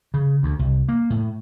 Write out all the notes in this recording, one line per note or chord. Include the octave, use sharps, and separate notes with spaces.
C#3
D2
C2
A#3
A2